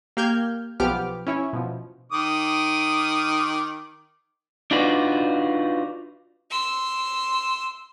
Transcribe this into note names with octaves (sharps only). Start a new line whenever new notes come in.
A#3 G4 F6 G6 G#6
B1 F3 B3 G4 D6 F6
C#4 E4 C#5
B2 F3
D#3 D6 D#6
D4 D#4 F4 F#4 B4 D5
C6 E6